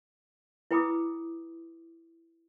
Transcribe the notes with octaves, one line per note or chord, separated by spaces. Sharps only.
E4 B4 G5 B5 D6 D#6